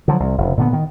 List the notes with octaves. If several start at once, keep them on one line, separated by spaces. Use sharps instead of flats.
D3 F3 F#3
C2
F1 C#3
A#2 D3 B3
D#3